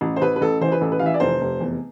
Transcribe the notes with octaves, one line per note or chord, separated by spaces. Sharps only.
A1
C5
A1 B4
B4
A1 A4
E3 C5
B4
A1 A4
B4
E3 F5
E5
D5
F1 C5
F1
E2